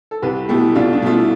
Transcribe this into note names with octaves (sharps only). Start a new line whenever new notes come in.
A4
C2 G4 B4
B2 A3 E4 G4
C2 D4 F4
D4
B2 A3 F4
E4